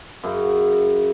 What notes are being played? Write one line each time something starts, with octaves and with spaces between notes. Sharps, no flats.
F#2 C#3